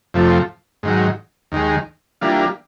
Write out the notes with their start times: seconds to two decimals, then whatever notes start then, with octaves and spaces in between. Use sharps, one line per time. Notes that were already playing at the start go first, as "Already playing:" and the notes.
0.14 F2 C3 F3 A3
0.83 G#2 D#3 F#3
1.52 D#2 D#3 G#3
2.21 E3 G3 A#3 D4 F4